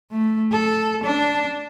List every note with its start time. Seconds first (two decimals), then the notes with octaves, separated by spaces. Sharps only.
0.11 A3
0.52 A4
1.03 D4